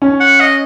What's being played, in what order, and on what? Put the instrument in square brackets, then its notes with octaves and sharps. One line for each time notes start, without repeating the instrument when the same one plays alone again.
[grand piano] C#4
[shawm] F#5
D#5